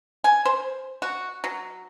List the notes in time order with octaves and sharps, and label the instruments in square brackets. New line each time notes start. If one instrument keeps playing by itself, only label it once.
[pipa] G#5
C5
F#4
F#3